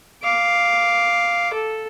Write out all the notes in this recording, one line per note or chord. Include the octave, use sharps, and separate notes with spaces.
F5 D6
A4